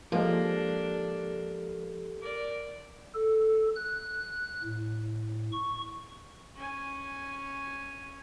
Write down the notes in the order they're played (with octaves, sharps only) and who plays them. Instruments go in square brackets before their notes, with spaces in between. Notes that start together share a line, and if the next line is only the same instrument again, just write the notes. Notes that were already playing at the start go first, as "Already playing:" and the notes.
[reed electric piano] F3 G#3 [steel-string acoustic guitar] A#3 [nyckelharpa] D4 [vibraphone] G4 A4
[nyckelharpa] A#4 D5
[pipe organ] A4
F#6
A2
C#6
[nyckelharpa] C#4 G#5